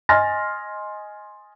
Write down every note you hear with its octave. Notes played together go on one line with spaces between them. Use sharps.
D#5 G#5 C6 F6 A6 A#6